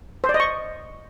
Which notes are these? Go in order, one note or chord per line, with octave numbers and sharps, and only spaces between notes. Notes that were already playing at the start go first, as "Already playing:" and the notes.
C5
D5
D#5
C#6